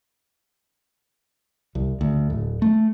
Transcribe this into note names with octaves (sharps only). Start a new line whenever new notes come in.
C2
D2
D1
A3